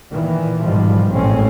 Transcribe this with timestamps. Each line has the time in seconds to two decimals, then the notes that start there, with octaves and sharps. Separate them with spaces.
0.11 A#2 D#3 E3
0.63 G#2 B2 D#3 F3 G3
1.12 A1 G#2 C4 C#4